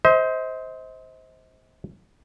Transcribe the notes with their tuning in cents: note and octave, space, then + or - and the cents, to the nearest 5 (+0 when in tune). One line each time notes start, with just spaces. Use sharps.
C5 -5 D#5 +40